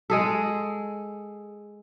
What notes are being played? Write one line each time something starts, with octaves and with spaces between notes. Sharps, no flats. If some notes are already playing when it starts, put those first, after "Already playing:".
G#3 G#4 A4